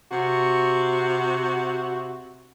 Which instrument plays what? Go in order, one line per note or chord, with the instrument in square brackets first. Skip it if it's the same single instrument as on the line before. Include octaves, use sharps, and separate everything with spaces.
[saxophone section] C3 F#4